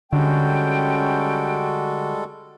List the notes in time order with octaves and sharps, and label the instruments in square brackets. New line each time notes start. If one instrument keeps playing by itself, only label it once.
[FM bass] D3 [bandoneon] G3 G#3 A4 [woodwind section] C#4 G5 [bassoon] F#4